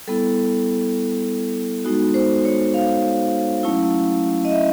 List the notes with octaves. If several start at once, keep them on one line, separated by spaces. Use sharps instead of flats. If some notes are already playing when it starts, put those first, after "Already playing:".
G3 B3 E4 A4
G#3 B3 D#4 F#4
C5
C#5
F5
F#3 A3 C#4 E4
D#5
E5